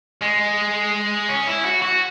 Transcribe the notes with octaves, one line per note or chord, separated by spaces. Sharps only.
G#3
C#4
E4
F#4
F#4